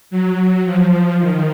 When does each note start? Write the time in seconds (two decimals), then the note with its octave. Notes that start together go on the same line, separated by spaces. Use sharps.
0.11 F#3
0.65 F3
1.20 D#3